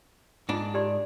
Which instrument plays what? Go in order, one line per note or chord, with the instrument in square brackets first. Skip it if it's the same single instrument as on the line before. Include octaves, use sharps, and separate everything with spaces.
[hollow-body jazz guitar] G#2 D4 [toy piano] F4
[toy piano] G4 D5 C6